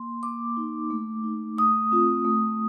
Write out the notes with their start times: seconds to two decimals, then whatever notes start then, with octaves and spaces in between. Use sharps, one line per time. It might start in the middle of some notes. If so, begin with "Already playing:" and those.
Already playing: A#3 C6
0.23 A#3 D6
0.57 D#4
0.90 A3
1.24 D#4
1.57 A3 D#6
1.92 C4 F4
2.25 A3